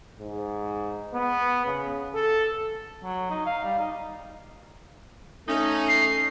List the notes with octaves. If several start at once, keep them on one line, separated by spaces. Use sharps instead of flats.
G#2
B3
C#3
A4
F#3
D#4
F5
G3
D#4
A3 C#4 D#4
C7